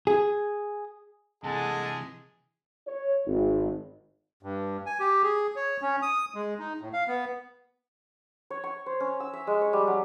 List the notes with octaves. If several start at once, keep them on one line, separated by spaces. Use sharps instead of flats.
G#4
C3 E3 G#3 G#4 A4 F#5 A5
C#5
G#1
G2
G#5
G4
G#4
C#5
C#4
D#6
G#3
D#4
A2
F5
B3
C#5
C#6
C5
C#4
E6
E5
G#3
C#5
G3
F#3